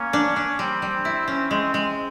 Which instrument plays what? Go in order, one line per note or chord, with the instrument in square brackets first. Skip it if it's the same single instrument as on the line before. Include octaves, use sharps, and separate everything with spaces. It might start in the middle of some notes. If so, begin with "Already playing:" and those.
Already playing: [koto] A#3 [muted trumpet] C#4
[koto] D4
D4
[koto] G3 [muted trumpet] C4
[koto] G3
E4
C#4
[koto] G#3 [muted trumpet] C4
[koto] G#3